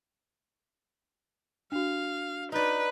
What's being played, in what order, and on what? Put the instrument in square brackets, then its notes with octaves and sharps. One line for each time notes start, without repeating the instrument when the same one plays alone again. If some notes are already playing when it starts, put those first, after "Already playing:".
[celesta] D4 F#4 [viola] F5
[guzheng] D#4 D5 [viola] B4